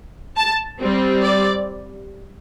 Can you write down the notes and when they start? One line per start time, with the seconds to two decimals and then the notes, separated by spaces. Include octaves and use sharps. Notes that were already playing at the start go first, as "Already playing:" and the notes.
0.36 A5
0.79 G3 C4
1.22 D5